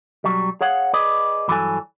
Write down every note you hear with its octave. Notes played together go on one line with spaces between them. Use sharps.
B1 F#3 G3
G#4 C#5 F5 F#5
G#4 B4 D5 D#5
G2 E3 F#3 D4 A4 G#5